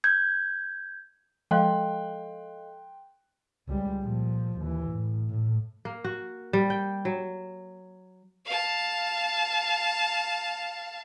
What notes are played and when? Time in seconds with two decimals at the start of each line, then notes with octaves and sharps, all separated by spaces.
0.04 G6 G#6
1.51 F3 G#3 A4 D#5 F5 G5 C6 F#6
3.68 C#2 G3
4.03 A#2 F3
4.60 D#2 E3
4.91 A2
5.30 A2
5.85 A#3
6.04 F#4
6.53 G3
6.70 G5
7.05 F#3
8.45 F5 A5